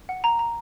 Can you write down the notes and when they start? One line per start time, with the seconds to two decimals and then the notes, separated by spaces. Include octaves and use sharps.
0.09 F#5
0.24 A#5
0.39 A#5